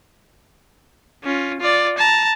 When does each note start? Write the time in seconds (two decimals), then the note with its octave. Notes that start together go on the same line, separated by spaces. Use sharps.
1.24 C#4 F4
1.61 F4 D5
1.98 A5 A#5